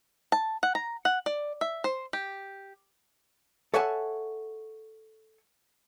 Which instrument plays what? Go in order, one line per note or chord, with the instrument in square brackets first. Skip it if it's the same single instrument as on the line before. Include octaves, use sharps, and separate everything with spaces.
[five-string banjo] A5
F#5
A#5
F#5
D5
E5
C5
G4
[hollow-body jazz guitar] A4 C#5 E5 F#5 G#5 A5